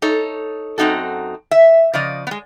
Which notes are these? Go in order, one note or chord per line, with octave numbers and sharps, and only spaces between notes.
D#4 A4 C#5
F#2 C4 D#4 F#4 A4
E5
C#3 F3 D5 D#5
G#3 B3